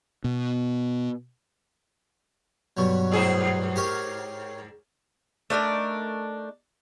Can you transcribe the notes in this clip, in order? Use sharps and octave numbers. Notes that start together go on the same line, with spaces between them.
B2
G2 B2 F#3
G#2 G#4 C5
G4 A#4 C#5
A3 D4 D#4 A#4